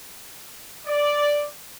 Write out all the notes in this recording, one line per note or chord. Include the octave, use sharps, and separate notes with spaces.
D5